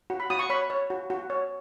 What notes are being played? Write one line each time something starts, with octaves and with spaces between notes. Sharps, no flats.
F#4
B5
F#4 D#6
C#6
C#5 B5
C#5
F#4
F#4
C#5